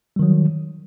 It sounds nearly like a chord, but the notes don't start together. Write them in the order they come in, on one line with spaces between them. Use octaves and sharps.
G3 D#3 F#3